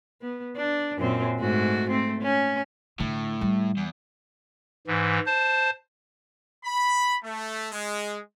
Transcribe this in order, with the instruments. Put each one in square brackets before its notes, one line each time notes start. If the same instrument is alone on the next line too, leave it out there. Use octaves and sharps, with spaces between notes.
[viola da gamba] B3
D4
F#2 A#2 C4
G#2 A3 F#4
A3 C4
C#4
[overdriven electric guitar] A2 [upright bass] D3
[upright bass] G3
[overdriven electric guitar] E2
[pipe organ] G#2 E3
C5 A5
[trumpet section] B5
A3
G#3